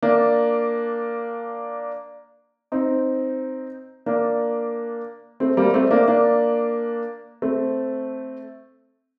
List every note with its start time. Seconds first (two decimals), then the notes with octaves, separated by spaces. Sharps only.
0.02 A#3 D4
2.72 C4 D#4
4.06 A#3 D4
5.40 A3 C4
5.57 G3 A#3
5.74 A3 C4
5.91 A#3 D4
6.08 A#3 D4
7.42 A3 C4